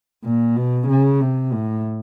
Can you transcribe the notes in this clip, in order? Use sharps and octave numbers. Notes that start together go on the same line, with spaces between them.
A#2
B2
C#3
C3
A2